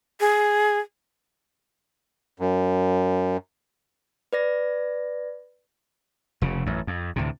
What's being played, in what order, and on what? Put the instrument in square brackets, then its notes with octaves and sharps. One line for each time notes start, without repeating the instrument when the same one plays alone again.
[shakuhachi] G#4
[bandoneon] F#2
[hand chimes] B4 D5 A#6
[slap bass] F1 C#3
A1 F#2
F2
D2 A2 C3